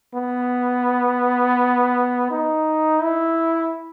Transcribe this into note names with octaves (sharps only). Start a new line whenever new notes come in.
B3
D#4
E4